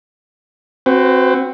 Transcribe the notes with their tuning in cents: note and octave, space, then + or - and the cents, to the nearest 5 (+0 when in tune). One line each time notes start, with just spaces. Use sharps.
C4 +15 F#4 +0 B4 +35